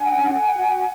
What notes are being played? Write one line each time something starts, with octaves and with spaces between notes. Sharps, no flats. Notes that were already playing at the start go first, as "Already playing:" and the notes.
Already playing: D4 F#5 G#5
C#4
A4
F#4